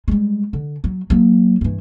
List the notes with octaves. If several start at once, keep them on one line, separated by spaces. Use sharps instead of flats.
G3 G#3
D3
F#3
F#3 A#3
G2 E3